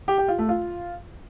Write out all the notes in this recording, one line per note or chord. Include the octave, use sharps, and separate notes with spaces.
G4
G4
F4
A3
F4